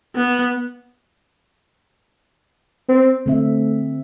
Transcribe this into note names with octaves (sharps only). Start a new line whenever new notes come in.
B3
C4
D3 A3 C4 E5